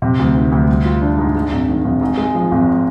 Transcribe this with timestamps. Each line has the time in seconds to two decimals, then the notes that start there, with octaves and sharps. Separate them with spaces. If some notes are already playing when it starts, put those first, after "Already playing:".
0.02 C3
0.19 D2
0.35 D#3
0.52 D2
0.68 G3
0.85 F4
1.02 D4
1.19 G#2
1.35 G#2
1.51 G#1
1.69 D#3
1.85 G#1
2.01 G#2
2.17 G#3
2.35 F3
2.51 G#1